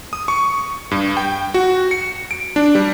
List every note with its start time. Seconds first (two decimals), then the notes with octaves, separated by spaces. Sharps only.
0.13 D#6
0.28 C#6
0.91 G2
1.17 G5
1.54 F#4
1.91 C#7
2.31 D7
2.56 D4
2.75 G3